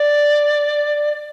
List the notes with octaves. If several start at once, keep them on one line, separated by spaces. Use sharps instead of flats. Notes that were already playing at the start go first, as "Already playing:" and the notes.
Already playing: D5